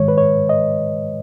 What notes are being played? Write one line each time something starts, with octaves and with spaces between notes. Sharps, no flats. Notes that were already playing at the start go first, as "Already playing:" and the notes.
Already playing: G#2 D#3 G#3 C#5
B4
C#5
D#5